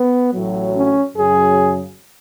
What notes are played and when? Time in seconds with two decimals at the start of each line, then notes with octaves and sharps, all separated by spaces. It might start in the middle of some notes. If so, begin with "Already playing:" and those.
Already playing: B3
0.33 A1 A2 F#3
0.75 C#4
1.16 F#2 C#3 F#3 G#4